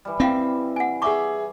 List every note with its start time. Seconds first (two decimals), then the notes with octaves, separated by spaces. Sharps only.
0.05 E3 G3
0.20 C4 E4 F5 G5
0.76 F#5 G#5
1.02 G#4 E5 G#5 C#6 D6